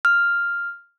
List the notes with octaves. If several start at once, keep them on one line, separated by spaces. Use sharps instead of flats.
F6